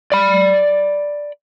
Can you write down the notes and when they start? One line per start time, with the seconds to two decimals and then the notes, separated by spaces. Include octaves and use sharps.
0.12 D5 B5